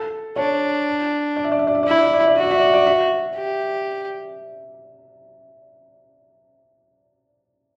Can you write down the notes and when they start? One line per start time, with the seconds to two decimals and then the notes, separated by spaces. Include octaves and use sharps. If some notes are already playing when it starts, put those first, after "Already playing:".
Already playing: A4
0.36 D4 C#5
1.36 D5
1.44 E5
1.52 D5
1.59 E5
1.67 D5
1.75 E5
1.83 D5
1.87 E4 E5
1.98 D5
2.06 E5
2.13 D5
2.20 E5
2.27 D5
2.35 F#4 E5
2.43 D5
2.51 E5
2.58 D5
2.66 E5
2.74 D5
2.87 E5
3.36 G4